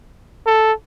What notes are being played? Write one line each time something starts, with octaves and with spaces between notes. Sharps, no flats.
A4